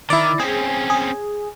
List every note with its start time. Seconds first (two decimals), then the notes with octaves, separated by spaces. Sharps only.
0.10 D#3 E4 D5
0.40 C4 C#4 G#4
0.90 G#4